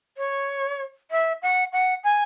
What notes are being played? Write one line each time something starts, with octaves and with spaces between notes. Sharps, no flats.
C#5
E5
F#5
F#5
G#5